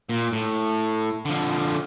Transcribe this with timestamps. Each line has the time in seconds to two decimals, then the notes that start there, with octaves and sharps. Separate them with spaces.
0.09 A#2
0.33 A2
1.25 D3 F3